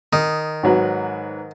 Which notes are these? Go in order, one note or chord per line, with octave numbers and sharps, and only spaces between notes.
D#3 D#6
G#2 F#3 B4